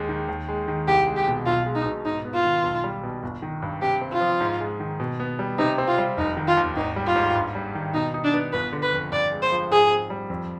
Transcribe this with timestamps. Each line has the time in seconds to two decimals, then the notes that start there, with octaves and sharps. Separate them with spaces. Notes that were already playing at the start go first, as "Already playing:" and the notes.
Already playing: D#2 G#3
0.09 D#3
0.28 D#2
0.49 G#3
0.68 D#3
0.87 C2 G4
1.07 G#3
1.16 G4
1.27 B2
1.46 B1 F4
1.66 G#3
1.75 D#4
1.86 B2
2.05 G#2 D#4
2.25 B3
2.34 F4
2.44 D#3
2.64 B1
2.84 G3
3.03 B2
3.23 G1
3.42 D#3
3.62 G2
3.82 C3 G4
4.01 C4
4.12 F4
4.21 F3
4.41 G#2
4.60 G#3
4.80 D#3
5.00 B2
5.20 B3
5.39 G3
5.58 C3 D#4
5.78 C4
5.87 F4
5.98 G3
6.17 F1 D#4
6.37 D#3
6.48 F4
6.57 D#2
6.76 G#1 D#4
6.96 G3
7.06 F4
7.16 G#2
7.35 G2
7.55 G3
7.75 D#3
7.94 B2 D#4
8.14 D#4
8.24 D4
8.34 B3
8.53 G1 B4
8.72 D3
8.82 B4
8.93 F2
9.12 G2 D5
9.32 G#3
9.42 C5
9.52 F3
9.71 G#2 G#4
9.91 C4
10.10 G3
10.30 F2